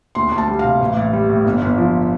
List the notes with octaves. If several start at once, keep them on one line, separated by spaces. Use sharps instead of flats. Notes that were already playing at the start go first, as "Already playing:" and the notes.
D2 C6
D2
A5
G3
C3 F5
A1
A1
G3
A2
G1
G1
F3